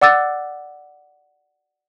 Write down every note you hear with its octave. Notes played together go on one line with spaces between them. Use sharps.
D5 F#5 D6 E6 F#6 A6